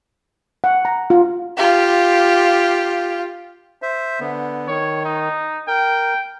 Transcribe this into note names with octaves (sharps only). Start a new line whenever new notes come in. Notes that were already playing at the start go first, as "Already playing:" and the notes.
F#5
A#5
F4
F4 G4
C5 E5
D3 B3
D#3 C#5
D#4
A#4 G5